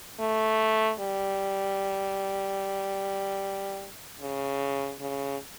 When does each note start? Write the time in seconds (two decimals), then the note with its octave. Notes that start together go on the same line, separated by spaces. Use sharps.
0.20 A3
1.00 G3
4.21 C#3
5.01 C#3